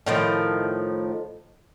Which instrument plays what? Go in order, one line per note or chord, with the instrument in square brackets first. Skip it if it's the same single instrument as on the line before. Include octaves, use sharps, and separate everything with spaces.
[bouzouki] A2 D#3 F3